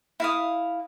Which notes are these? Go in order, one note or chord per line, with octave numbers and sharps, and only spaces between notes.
E4 F5 D#6